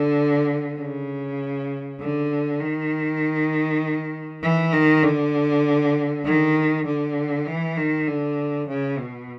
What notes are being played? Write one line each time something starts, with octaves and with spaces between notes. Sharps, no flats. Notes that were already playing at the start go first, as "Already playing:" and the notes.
Already playing: D3
C#3
D3
D#3
E3
D#3
D3
D#3
D3
E3
D#3
D3
C#3
B2